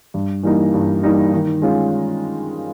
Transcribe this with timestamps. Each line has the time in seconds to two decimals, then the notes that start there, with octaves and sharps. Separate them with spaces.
0.14 G2
0.43 E3 G3 A#3 D#4
0.74 G2
1.03 E3 G3 A#3 D#4
1.33 D#3
1.62 G#3 C#4 F4